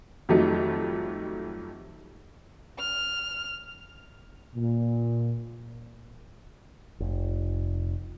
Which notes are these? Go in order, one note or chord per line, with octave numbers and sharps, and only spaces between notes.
F2 D#3 F#3 G3 A3 D#4
F6
A#2
F1